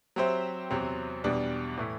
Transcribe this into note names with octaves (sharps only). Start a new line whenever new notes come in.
F#3 C4 G4 C5 E5
E2 C3 F#3 C4
E2 B2 G3 D4
A2 E3 A3 E4